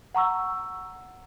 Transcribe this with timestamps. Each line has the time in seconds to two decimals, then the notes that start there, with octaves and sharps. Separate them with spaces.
0.15 F#5 A#5 C#6 E6